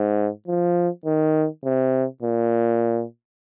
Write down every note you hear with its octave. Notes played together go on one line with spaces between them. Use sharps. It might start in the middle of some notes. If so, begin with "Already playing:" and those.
Already playing: G#2
F3
D#3
C3
A#2